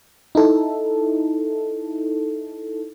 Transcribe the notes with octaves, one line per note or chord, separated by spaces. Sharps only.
D#4 E4 A4